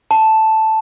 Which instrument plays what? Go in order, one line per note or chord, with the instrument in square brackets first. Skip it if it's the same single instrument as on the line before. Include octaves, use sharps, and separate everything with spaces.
[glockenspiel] A5